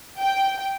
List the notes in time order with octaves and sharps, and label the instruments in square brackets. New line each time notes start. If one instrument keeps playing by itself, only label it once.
[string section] G5